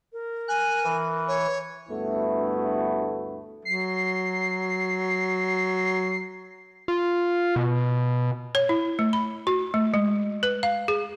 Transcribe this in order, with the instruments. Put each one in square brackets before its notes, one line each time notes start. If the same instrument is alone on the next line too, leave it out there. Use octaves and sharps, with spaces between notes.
[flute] A#4
[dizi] G#5 [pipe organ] F#6
[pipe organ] E3
[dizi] C#5
[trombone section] D2 G2 A3 B3 E4 F#4
[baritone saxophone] F#3 [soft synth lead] C7
[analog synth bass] F4
B2
[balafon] C#5
E4
A3
B5
F#4
A3
G#3
B4
F5
G#4